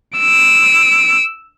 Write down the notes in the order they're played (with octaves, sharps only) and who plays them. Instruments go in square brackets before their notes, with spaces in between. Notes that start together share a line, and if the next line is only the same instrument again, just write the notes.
[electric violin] E6 D7